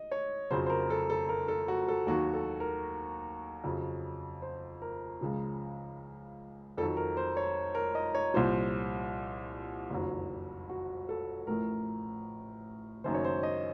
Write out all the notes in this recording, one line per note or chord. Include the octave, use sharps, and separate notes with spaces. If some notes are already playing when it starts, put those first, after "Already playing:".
Already playing: D#5
C#5
F2 C#3 F#3 C5
C5
A#4
A4
A4
A#4
A4
F#4
A4
D#2 D#3 F#3 F#4
A4
A#4
F2 C#3 F#3
C5
A#4
C#2 C#3 F3
F2 D#3 F#3 A4
A#4
C5
C#5
A#4
D#5
C#5
C2 A#2 F3 C5
F#1 F2 D#3 F#3
F#4
A4
A1 A2 F3 A#4
F#1 F#2 D#3 F#3 C5
C#5
C5
D#5